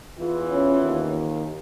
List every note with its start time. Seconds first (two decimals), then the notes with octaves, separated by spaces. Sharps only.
0.17 E2 E3 F4
0.51 C#4
0.82 D#2